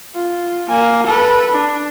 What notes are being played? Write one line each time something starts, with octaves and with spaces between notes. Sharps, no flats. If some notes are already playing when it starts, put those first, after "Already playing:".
F4
A#3 G#5
A4 B4
D4